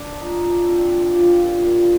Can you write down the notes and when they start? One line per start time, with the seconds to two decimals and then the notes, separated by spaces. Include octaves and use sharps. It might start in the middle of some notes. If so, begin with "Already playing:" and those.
Already playing: D4
0.14 F3
0.21 D#4
0.35 F3
0.50 D4
0.57 F3
0.66 C4
0.78 F3 D4
0.99 F3
1.07 F4
1.14 G4
1.22 F3 F4
1.35 F4
1.43 A#2
1.64 A#2